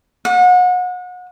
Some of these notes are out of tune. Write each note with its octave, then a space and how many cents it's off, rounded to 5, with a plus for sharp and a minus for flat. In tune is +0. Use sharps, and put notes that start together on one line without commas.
F#5 -35